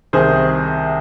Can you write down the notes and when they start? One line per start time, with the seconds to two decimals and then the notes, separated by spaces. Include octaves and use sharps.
0.13 C2 C3 D#3 G#4 C5